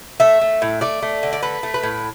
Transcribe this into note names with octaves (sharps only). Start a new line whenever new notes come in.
A3 E5
A3
A2
A3 D5
A3
D3
D5
A3 B4
A3
B4
A2